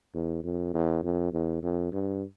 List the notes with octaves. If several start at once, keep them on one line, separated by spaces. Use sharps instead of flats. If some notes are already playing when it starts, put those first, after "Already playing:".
E2
F2
E2
F2
E2
F2
G2